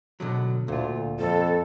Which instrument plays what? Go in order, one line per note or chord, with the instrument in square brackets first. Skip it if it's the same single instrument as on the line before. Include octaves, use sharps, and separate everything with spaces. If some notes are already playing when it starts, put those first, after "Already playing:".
[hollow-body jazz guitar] B2 D3 F#3
[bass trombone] D2 [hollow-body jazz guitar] A#2 F4
[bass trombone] F2 [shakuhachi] A4